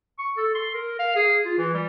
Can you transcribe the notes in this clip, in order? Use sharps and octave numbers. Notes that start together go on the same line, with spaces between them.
C#6
A4
C6
A#4
F5
G#4
F4
E3
G3